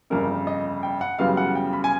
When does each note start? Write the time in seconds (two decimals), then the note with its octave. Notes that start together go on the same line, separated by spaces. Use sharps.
0.10 G1 F2 C#3 A#4
0.47 D#5
0.83 G5
1.01 F#5
1.19 F#2 C#3 E3 G3 B3 F5
1.37 F#5
1.55 G5
1.73 B5
1.84 G#5